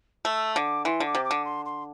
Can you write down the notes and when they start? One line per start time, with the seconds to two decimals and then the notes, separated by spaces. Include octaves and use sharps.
0.25 A3 E6
0.55 D3 D6
0.85 E3 C6
1.00 D3
1.06 D6
1.15 C3
1.25 D6
1.31 D3
1.45 C6
1.65 C6